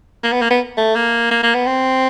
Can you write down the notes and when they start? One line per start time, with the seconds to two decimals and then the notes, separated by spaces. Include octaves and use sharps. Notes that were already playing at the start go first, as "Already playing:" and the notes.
0.23 A#3
0.32 B3
0.42 A#3
0.50 B3
0.77 A3
0.95 A#3
1.31 A#3
1.43 A#3
1.55 B3
1.66 C4